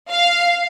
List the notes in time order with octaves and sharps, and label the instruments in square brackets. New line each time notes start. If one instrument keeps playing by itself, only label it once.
[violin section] F5